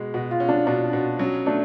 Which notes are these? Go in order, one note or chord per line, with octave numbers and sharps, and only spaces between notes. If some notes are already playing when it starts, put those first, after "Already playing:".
Already playing: B2 G#3
B2 F#4
F4
C#4
D4
B2 D4
B2
F#3 C#4
A3 D4